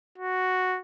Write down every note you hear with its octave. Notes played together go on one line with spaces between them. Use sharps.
F#4